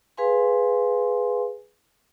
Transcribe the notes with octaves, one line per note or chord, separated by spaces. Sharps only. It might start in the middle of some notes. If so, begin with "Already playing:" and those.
G#4 B4 F5 G#5 C6